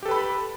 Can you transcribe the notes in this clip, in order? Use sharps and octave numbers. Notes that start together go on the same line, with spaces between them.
G4 A4 B4 B5